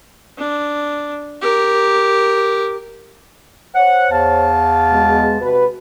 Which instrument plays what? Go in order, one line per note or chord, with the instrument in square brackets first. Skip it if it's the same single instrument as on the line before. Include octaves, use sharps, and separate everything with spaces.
[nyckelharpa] D4
G4 A#4
[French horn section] C5 C#5 [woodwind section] F#5
[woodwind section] E2 F5 A5
[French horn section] B2 G#3
C3 F#4 B4